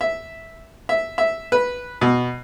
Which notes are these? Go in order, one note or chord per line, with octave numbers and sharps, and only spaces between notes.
E5
E5
E5
B4
B2